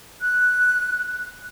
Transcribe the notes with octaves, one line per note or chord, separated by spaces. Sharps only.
F#6